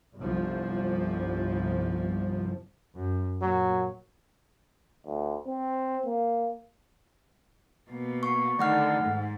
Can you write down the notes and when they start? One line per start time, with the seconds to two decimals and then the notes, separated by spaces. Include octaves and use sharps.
0.18 G1 C2 F3
2.95 F#2
3.42 A#2 F#3 A#3
5.06 D2
5.47 C4
6.06 A#3
7.91 B2 A#3
8.23 C#6
8.59 D3 D#3 A3 F#5 F6
9.04 G#2